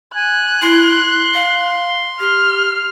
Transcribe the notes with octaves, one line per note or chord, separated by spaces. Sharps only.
G#5 F#6
E4 C6
F5
G4 F6